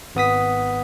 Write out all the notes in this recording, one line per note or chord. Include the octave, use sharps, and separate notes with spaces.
G#1 B3 D#6 B6